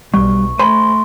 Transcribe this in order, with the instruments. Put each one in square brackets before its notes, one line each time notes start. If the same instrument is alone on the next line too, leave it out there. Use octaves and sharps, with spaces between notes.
[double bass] B1 [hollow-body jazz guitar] G3 [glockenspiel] C#6
[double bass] A3 [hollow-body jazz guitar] C5 G#5 B5 [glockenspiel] C6